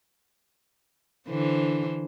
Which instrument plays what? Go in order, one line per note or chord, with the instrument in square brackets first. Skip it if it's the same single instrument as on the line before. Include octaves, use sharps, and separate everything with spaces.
[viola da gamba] D3 E3 C5